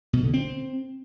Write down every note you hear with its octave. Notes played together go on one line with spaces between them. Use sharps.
B2
D3
C4